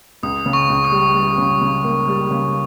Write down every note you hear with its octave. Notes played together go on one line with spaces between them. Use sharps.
C#2 D#6
C#3
C#6
C#2
D#6
G3
G3
C#3
C#3
A#3
G3
C#3